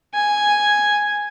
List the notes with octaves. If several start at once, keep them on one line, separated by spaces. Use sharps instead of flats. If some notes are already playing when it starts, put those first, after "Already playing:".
G#5